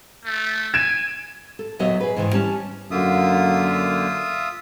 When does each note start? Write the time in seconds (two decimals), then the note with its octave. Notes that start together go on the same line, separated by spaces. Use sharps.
0.25 A3
0.74 G#5 G#6 D7 E7
1.59 A4
1.79 D#2 A#2 F#3 B3 D#5 E5
2.00 G#4 B4
2.16 G#2 D#3 E3
2.33 G3 C#4 A5
2.91 F#2 D3 A#3 F4 E5 D#6